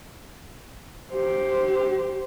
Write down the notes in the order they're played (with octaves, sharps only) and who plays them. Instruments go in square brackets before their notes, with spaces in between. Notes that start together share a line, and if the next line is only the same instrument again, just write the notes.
[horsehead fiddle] G4 C5